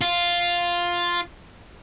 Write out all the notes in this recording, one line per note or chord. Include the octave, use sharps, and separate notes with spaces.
F4